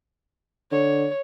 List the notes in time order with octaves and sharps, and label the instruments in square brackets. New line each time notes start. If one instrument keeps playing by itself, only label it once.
[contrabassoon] D3 [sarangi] C#5